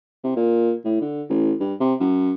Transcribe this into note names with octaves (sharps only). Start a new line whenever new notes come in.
C3
A#2
A2
D3
A1
G2
C3
F#2